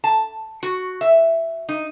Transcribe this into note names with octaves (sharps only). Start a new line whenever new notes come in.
A5
F#4
E5
D#4